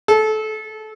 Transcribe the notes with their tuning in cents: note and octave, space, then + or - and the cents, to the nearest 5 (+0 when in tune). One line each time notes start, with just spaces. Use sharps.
A4 -25